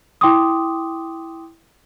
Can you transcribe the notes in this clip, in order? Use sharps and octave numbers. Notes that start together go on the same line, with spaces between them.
E4 G5 C6 D6 D#6